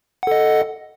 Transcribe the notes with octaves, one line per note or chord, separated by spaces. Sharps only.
A4 D#5 F#5